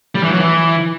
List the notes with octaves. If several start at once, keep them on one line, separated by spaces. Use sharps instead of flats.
G3
E3
F#3
E3